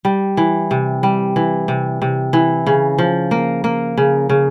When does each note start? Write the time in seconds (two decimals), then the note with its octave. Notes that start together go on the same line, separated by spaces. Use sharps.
0.05 G3
0.37 E3
0.71 C3
1.03 G3
1.36 E3
1.68 C3
2.02 C3
2.33 E3
2.67 C#3
2.99 F3
3.31 A#3
3.64 A#3
3.98 C#3
4.30 C#3